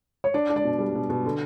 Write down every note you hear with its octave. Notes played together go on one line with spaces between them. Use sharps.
C#5
D4 D5
D4
D5
B2
G3
B2
B2
D3